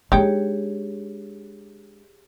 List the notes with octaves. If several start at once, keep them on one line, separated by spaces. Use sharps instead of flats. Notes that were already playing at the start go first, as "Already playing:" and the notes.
G#3 D4 D#4 G4 G#4 C#5 G5